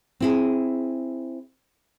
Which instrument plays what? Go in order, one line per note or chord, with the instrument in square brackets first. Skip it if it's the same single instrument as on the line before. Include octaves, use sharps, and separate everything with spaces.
[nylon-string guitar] C4 E4 G#4